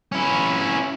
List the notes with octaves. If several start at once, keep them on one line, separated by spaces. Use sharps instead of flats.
C#4 E4